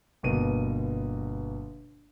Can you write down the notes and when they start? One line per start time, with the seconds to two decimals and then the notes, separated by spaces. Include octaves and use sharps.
0.23 G1 B2 A#3 D#7